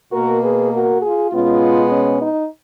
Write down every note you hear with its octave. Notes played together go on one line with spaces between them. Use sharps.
B2 A#3 F#4 A#4
G#4 B4
F#4 A#4
F4 G#4
B2 G#3 B3 C#4 F4
C#4
D#4